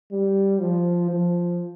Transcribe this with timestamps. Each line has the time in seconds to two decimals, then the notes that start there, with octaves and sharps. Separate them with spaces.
0.12 G3
0.61 F3
1.10 F3